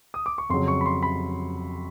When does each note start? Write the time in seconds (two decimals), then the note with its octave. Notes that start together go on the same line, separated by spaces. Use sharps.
0.14 D#6
0.26 D6
0.38 C#6
0.49 F2 C#3 F#3 C6
0.68 C#6
0.81 B5
0.86 C6
1.03 B5